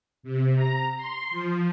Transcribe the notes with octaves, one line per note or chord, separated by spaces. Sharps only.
C3
A#5
C6
F3